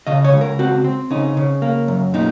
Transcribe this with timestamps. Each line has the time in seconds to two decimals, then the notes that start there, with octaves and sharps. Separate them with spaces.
0.07 C#3 D#5
0.24 C#5
0.33 C#2
0.41 A#4
0.59 C4 F#4
0.84 C4
1.11 C#3 D#4
1.37 C#3
1.62 A#3
1.88 F#2
2.14 A#2 D#4